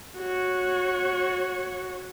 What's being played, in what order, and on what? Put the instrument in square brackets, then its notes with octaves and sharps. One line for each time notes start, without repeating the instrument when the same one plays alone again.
[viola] F#4 C#5